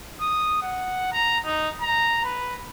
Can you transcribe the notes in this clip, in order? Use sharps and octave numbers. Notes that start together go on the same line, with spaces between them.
D#6
F#5
A#5
D#4
A#5
B4